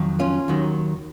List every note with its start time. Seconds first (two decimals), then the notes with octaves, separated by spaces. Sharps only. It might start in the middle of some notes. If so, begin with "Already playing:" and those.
Already playing: F2 D#3 F#3
0.20 C#4 F4
0.48 D#2 D#3 F#3